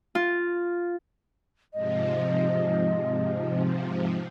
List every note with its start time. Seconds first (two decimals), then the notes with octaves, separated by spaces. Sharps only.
0.15 F4
1.74 G#2 C3 F3 D#5